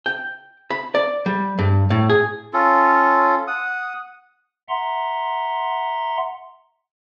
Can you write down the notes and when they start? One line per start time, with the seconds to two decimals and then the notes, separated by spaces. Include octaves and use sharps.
0.06 G5
0.70 B5
0.95 D5
1.26 G3
1.59 G2
1.90 A2
2.09 G#4
2.54 C#4 F4 A4
3.47 F#5 D#6
4.69 E5 F#5 A#5 C6